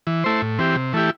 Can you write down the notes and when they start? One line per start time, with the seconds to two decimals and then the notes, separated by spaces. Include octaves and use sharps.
0.07 E3
0.24 A3 E4 C5
0.42 A2
0.59 E3 C4 G4
0.76 C3
0.93 E3 A3 E4 G4